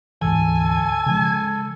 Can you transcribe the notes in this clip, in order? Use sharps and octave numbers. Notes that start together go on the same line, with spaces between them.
D2 G#2 E3 A4 G#5
C#3 F3 G#3